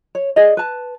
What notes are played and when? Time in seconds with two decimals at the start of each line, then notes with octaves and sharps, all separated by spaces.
0.15 C#5
0.36 G#4 D5 D#5
0.57 B4 A5